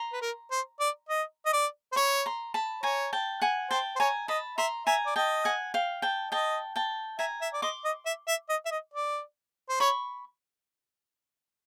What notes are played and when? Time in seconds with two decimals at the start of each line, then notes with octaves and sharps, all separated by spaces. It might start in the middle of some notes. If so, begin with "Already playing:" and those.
Already playing: A#5 C6
0.13 B4
0.22 A#4
0.51 C5
0.80 D5
1.09 D#5
1.46 D#5
1.53 D5
1.92 C5
1.96 C#5 B5 C#6
2.26 A#5 C6
2.54 A5 B5
2.83 C#5 G#5 A#5
3.13 G5 A5
3.42 F#5 G#5
3.70 C5 G5 A5
3.96 C5
4.00 C#5 G#5 A#5
4.28 D#5 A5 B5
4.58 E5 A#5 C6
4.86 E5 G#5 A#5
5.06 D5
5.16 D#5 G5 A5
5.45 F#5 G#5
5.74 F5 G5
6.02 G5 A5
6.31 D#5 G5 A5
6.76 G5 A5
7.19 E5 G#5 A#5
7.41 E5
7.54 D5
7.62 D#5 C6 D6
7.85 D#5
8.06 E5
8.28 E5
8.49 D#5
8.66 E5
8.71 D#5
8.94 D5
9.69 C5
9.80 C#5 B5 C#6